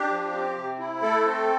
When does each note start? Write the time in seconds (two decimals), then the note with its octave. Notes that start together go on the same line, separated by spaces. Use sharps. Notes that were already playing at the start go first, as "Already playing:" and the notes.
Already playing: D4 G4
0.10 F3
0.33 C4
0.57 C3
0.79 E4
1.02 A3 A4
1.25 C4